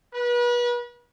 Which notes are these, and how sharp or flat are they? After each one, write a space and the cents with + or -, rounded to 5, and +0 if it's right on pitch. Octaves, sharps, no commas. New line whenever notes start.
B4 -35